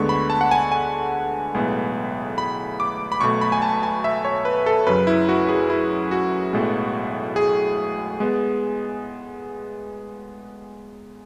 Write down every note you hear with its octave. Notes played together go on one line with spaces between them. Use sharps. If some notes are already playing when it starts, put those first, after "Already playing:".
Already playing: D2 D3 G#3 B3 C#6
B5
A5
F#5
G#5
G#5
B1 A2 G#3 B3
B5
D6
B5
B1 B2 A3 C#6
B5
G#5
A5
G#5
E5
C#5
B4
A4
F#2 C#3 F#3 B4
E4
F#4
G#4
E4
F#4
B1 A2 G#3 B3
G#4
G#3 B3